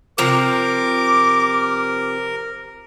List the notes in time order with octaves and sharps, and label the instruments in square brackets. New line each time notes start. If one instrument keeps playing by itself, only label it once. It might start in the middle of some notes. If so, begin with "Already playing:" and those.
[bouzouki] C3 F3 A#5 [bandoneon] A#4 [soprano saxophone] D6